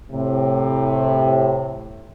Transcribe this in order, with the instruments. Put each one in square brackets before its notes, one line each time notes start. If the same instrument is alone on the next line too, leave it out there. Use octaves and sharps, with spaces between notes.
[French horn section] A2 C3